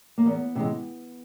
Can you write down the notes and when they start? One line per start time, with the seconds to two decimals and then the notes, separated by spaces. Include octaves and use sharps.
0.18 A#3
0.26 E2 B3
0.55 C3 E3 G#3